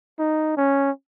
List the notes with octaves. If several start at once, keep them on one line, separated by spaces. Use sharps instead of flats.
D#4
C#4